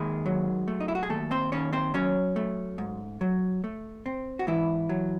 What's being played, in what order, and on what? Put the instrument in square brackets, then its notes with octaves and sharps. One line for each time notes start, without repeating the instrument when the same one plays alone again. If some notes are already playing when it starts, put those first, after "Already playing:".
Already playing: [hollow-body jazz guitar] D#2 D#3 G#3 G#4
F#3
A3
D#4
E4
F#4
G#4
D#2 A3 A4
C4 C5
D#3 C#4 C#5
C4 C5
F#3 C#4 C#5
A3
G#2
F#3
A3
C4
F#4
G#2 E3 E4
F#3